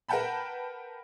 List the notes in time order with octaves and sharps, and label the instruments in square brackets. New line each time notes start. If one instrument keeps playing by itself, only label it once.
[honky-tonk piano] A#4 B4 F#5 G5 A5 B5